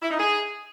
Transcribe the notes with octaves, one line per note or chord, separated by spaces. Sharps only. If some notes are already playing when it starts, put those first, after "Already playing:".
E4
D#4
G#4